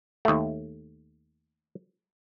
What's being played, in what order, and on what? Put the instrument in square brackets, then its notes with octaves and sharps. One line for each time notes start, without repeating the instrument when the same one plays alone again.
[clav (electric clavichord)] D#2 A3